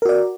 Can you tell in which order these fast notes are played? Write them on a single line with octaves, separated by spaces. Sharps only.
A#4 F#4 D5